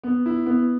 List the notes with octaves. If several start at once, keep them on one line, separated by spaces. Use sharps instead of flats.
B3
E4
B3